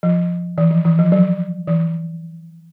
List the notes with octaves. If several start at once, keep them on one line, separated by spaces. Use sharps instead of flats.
F3
E3
F3
E3
F3
F#3
E3